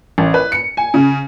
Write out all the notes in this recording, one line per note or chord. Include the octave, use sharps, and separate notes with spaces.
A1
B4
C#7
G#5
C#3